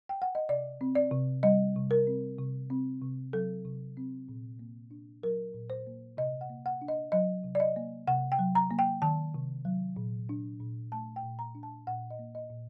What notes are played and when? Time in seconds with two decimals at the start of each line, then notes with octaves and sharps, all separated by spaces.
0.09 G5
0.22 F#5
0.35 D#5
0.49 C3 D5
0.81 C4
0.95 D5
1.11 C3
1.43 G3 D#5
1.76 C3
1.91 A#4
2.07 C4
2.38 C3
2.70 C4
3.01 C3
3.33 F#3 A4
3.65 C3
3.97 C4
4.29 A#2
4.59 A#3
4.91 D4
5.23 F#3 A#4
5.54 A#2
5.70 C5
5.87 A#3
6.17 C3 D#5
6.41 F#5
6.50 A#3
6.66 F#5
6.82 D4
6.88 D#5
7.12 F#3 D#5
7.44 C3
7.55 D5
7.60 D#5
7.76 A#3
8.07 C3 F#5
8.32 G5
8.39 F#3
8.55 A#5
8.71 A#3
8.79 G5
9.02 D#3 A5
9.34 C3
9.65 F#3
9.96 A#2
10.29 D4
10.60 A#2
10.92 A3 A5
11.16 G5
11.23 A#2
11.39 A#5
11.55 D4
11.63 A5
11.87 A#2 F#5
12.11 D#5
12.19 A#3
12.35 D#5
12.50 A#2